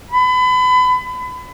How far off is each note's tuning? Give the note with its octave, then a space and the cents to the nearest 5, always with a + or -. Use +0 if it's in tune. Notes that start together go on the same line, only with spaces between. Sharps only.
B5 +30